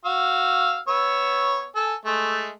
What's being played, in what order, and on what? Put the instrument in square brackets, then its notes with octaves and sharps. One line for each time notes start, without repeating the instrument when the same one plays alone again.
[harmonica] F#4 F5 E6
B3 C#5 E6
A4 G#5
G#3 A3